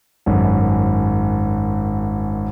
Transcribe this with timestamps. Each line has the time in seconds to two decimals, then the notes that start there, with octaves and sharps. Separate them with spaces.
0.26 G#1 F#2